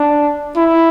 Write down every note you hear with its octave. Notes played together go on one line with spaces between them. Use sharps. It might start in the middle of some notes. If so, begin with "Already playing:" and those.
Already playing: D4
E4